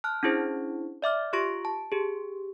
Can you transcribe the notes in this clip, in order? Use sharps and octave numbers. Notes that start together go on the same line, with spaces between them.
A5 F6 F#6
C#4 D4 E4 G#4 C5
D5 E5 D6 F6
F4 G4 C6 C#6 A#6 D7
A5
G4 G#4